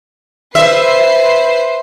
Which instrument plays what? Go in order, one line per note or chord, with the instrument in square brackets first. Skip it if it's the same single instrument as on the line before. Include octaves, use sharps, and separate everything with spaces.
[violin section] B4 C5 C7 [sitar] E5